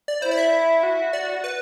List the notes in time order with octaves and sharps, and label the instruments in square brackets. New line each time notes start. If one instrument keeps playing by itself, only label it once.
[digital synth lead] D5
[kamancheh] E4 [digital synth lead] C5
[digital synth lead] D5
E5
[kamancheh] F#4
[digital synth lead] D5
B4